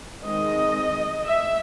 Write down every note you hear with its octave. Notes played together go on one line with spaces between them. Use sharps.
D#3 G#3 C4 D#5
E5